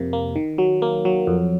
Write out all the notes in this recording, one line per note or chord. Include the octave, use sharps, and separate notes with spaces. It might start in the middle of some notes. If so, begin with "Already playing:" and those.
Already playing: F2 C3 A#3
A#3
D#3
F#3
A#3
F#3
F2